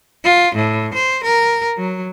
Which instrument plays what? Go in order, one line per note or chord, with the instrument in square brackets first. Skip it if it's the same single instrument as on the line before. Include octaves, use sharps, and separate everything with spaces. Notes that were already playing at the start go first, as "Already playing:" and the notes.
[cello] F4
A2
C5
A#4
F#3